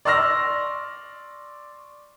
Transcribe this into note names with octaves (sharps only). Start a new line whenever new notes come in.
D5 C6 C#6 E6 F6 A#6